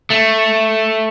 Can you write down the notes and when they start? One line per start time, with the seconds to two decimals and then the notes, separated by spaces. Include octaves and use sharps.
0.10 A3